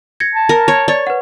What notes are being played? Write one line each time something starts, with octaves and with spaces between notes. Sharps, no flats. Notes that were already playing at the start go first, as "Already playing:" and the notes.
G#6 A#6 C#7
A5
A#4
C#5
C#5 D5 A6
B4 F#5